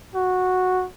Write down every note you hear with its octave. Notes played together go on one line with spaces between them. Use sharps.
F#4